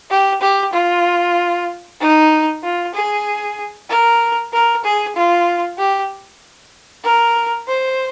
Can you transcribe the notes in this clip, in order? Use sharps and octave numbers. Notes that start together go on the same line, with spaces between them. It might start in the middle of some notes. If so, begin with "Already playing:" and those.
G4
G4
F4
D#4
F4
G#4
A#4
A#4
G#4
F4
G4
A#4
C5